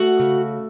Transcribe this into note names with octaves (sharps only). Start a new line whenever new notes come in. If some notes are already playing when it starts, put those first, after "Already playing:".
Already playing: A3 F#4 F#5
C#3